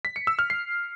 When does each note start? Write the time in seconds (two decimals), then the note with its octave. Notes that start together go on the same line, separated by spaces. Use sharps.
0.05 B6
0.16 C#7
0.27 E6
0.39 F6
0.50 C7